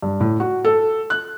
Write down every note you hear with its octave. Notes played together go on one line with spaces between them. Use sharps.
G2
A2
F#4
A4
F#6